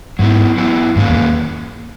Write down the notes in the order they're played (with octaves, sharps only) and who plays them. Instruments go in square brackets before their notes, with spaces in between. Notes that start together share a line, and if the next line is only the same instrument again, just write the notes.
[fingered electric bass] G#2 [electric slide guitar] F#3 B3 E4
[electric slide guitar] F#3 B3 E4
[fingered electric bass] G#2 [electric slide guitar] D#3 A#3 C#4 G#4 B4
[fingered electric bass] E2